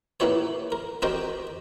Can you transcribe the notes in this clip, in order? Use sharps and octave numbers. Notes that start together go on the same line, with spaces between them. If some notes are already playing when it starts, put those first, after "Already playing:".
A#3 B3 E4 G4 C#5
A#4
C4 F#4 G4 A#4 D#5 G5